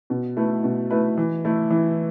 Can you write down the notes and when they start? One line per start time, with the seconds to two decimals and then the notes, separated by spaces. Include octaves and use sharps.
0.10 B2
0.36 A3 E4 B4
0.64 B2
0.90 A3 E4 B4
1.18 E3
1.45 A3 E4
1.70 E3